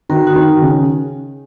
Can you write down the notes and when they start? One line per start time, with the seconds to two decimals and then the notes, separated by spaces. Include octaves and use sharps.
0.09 D#3 F#4 A#4
0.27 D#4 F#4
0.36 D#3
0.62 C#3